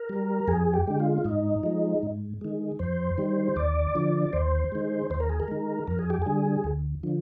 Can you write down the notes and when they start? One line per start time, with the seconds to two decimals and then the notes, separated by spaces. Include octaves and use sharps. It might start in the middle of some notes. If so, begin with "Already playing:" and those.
Already playing: A#4
0.09 G3
0.48 F2 G#4
0.74 G4
0.87 D3 G#3
1.00 F4
1.25 G#2 D#4
1.63 F3 G#3
2.03 G#2
2.41 D#3 G#3
2.79 F2 C5
3.18 D#3 G3
3.56 D#2 D5
3.95 D3 F3
4.33 D#2 C5
4.72 D#3 G#3
5.10 D#2 C5
5.20 A#4
5.29 G#4
5.40 A#4
5.48 D#3 G#3
5.87 F2 A#4
5.99 G#4
6.10 G4
6.22 D3 G3 G#4
6.64 D2
7.03 D3 F3